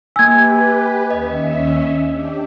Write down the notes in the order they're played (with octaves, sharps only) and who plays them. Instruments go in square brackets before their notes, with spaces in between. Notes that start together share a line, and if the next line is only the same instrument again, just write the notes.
[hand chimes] A#3 G#5 [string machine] G4 B4 [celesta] E6 G#6
[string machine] D#2 C#4 E5 [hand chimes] D#5
[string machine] D4 G4